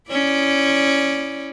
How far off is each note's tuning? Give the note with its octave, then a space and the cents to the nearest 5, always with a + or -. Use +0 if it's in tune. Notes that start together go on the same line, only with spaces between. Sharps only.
C#4 +0 E4 +0 D5 +0